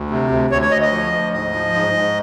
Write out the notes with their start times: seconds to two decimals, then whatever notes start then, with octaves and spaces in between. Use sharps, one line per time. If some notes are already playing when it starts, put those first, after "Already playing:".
Already playing: D2
0.10 C3
0.31 D2
0.51 D2 C#5
0.62 C#5
0.71 D2 D#5
0.82 D#5
0.92 F3
1.12 D2
1.33 G#2 D#5
1.53 F3
1.74 G#2
1.94 G#2